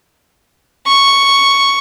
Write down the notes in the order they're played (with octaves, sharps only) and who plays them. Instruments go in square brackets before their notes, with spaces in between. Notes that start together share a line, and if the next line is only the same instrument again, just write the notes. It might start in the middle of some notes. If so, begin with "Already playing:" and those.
[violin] C#6